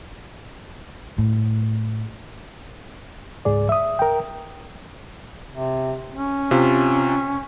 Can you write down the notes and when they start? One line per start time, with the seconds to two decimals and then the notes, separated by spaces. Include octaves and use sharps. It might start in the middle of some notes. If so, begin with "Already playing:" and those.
1.18 A2
3.45 C#2 G#2 G#4 D5
3.69 E5 D#6
3.99 A#4 G5
5.52 C3
6.15 C#4
6.51 C3 F4